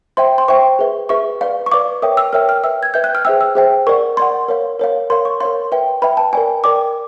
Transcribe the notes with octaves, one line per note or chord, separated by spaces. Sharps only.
C5 E5 G5 C6
C6
C5 E5 G5 C#6
G#4 B4 E5
G#4 B4 E5 C#6
B4 D5 F5
C#6
B4 D5 F5 D6
A#4 C#5 E5 G5 D#6
E6
A#4 C#5 E5 G5 F6
F6
B4 E5 G5 E6
G#6
B4 E5 G5 G6
F#6
F6
G#4 C5 E5 G5 E6
E6
G#4 C5 E5 G5
A#4 D5 F#5 C#6
A#4 D5 F#5 C6
A#4 C#5 F5
A#4 C#5 F5
A#4 C#5 F5 C6
C#6
A#4 C#5 F5 C6
B4 E5 G5
B4 E5 G5 B5
A5
A#4 D5 G5 G#5
A#4 D5 G5 D6